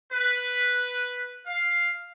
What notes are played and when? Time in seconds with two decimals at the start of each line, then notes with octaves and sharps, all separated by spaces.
0.12 B4
1.46 F5